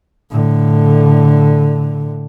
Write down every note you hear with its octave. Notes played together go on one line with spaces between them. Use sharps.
A2 D3